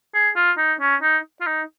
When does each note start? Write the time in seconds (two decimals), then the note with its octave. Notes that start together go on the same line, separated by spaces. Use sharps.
0.14 G#4
0.36 F4
0.58 D#4
0.80 C#4
1.02 D#4
1.41 F4
1.46 D#4